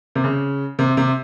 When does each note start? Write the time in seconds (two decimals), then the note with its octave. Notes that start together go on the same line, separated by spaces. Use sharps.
0.15 C3
0.24 C#3
0.79 C3
0.97 C3